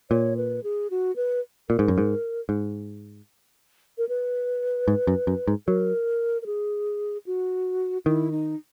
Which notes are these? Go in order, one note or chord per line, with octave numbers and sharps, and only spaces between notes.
A#2 C#5
B4
G#4
F#4
B4
A#2 A#4
G#2
F#2
G#2
G#2
A#4
B4
G#2
F#2
F#2
G#2
F#3 A#4
A#4
G#4
F#4
D#3 E4
D#4